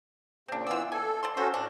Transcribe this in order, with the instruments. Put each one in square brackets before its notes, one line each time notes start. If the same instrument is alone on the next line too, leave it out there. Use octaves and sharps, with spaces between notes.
[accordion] A#2 C#3 [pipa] C4 D4
[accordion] E3 B3 E6 [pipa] F4 D5
[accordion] A4 [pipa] G#5
[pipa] D5 A5 C6
[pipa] C3 C5 [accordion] C#4 F#4 A4
[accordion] A2 [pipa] D4